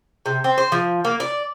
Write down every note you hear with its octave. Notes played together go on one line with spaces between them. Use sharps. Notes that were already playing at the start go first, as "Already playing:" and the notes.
C3
C4
C5
F3
A#3
D5